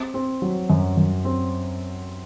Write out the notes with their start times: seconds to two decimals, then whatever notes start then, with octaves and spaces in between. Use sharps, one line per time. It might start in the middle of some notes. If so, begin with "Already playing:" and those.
Already playing: C4
0.14 C4
0.42 F#3
0.70 F#2
0.97 F#2
1.25 C4